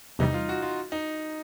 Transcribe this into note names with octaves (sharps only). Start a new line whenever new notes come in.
E2 C3 E3 G3 D#4
F4
F#4
F4
D#4